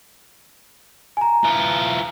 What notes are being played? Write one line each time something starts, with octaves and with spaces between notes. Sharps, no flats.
G#5 A#5
E3 F4